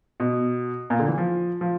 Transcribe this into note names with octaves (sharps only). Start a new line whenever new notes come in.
B2
A#2
D3
E3
F3
F3